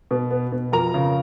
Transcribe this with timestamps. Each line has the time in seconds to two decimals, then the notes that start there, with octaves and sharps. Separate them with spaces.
0.11 B2
0.30 B3
0.52 B2
0.72 F2 A#4 A#5
0.94 C#3